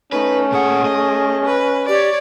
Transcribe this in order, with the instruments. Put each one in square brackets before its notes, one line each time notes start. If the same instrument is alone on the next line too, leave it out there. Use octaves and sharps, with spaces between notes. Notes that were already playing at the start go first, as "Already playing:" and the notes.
[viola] A3 [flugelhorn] C#4 [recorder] D#4 [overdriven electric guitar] B4
[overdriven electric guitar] A#2 F#5 [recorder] G#4
[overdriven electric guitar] D#5
[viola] B4
[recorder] G4 [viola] C#5 D5